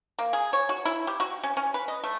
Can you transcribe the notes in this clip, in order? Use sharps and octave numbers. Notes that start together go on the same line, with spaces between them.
A#3
G#4
C#5
F#4
E4
G4
F#4
C#4
C#4
B4
D#5
A3